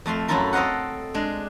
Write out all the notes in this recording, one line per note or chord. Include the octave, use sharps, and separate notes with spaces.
F2 A3 F5 C6
F#2 C#4 E4 F4 A4 A#4
C4 A4 D#5 F5 F#5
G#3 D4